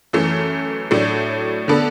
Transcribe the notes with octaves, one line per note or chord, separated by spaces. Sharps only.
F#2 E3 A3
A2 F#3 A3 D4
D3 B3 D4 A4